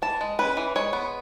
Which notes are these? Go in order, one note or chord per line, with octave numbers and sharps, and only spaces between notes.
E3 A5
G#3
C#4 B4
E3
G#3 C#5
B3